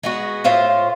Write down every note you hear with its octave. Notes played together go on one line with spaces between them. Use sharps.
G#3 B3 F#4
A2 F4 C5 F5